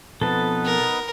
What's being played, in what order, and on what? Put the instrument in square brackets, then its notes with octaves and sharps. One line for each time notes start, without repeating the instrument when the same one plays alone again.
[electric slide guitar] B2 F3 C4 [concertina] B3 D#4 B4 [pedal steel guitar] A4 A5
[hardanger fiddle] A#4